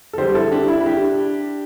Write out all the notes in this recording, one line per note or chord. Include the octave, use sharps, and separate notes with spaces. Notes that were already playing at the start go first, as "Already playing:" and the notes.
A4
D3 G3 G4 C5
E4 A4
D4 G4
E4
E4
D4 G4